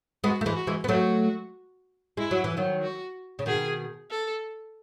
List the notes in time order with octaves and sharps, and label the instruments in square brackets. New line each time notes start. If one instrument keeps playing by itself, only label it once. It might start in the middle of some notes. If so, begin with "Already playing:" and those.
[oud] G#3 B3 [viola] F#4
[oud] A3
E3 G#3
[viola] F#4
[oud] E3 G#3
B3
[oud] F#3 A3 [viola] F#4
[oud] G#3 [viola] E4
[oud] F#3
E3
D#3 F#3
[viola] F#4
[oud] C#3
[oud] B2 D#3 [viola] G#4
[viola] A4